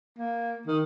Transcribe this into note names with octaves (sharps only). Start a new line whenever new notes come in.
A#3
D#3